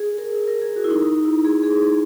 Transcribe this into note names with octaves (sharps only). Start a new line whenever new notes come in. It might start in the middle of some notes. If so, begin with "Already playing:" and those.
Already playing: G#4
A#4
A#4
G#4
F#4
E4
D#4
D#4
E4
G#4
G#4